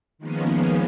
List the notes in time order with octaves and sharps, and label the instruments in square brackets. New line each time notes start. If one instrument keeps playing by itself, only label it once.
[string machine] D#3 F3 G#3 A#3 B3 C#4